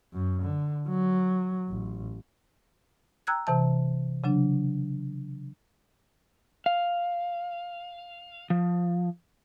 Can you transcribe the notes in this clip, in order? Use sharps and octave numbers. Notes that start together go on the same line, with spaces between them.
F#2
D3
F#3
A1
G5 A#5 E6 F#6 G#6
C3 E3 A5
C#3 F#3 D4
F5
F3